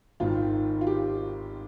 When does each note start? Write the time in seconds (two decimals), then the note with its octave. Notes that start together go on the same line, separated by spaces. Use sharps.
0.20 G#1 G#2 D#3 F4
0.81 F4
0.87 G4